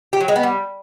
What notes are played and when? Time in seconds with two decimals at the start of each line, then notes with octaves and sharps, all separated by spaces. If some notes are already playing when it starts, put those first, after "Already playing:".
0.13 G4
0.21 F#3
0.28 G#3
0.36 B3
0.43 G3